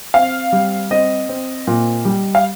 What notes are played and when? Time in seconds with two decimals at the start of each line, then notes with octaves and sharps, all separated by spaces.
0.14 C4 F5
0.52 G3
0.91 C4 D#5
1.29 C4
1.67 A#2
2.05 G3
2.35 F5